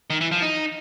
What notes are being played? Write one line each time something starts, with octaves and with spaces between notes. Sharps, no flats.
D#3
E3
F3
D#4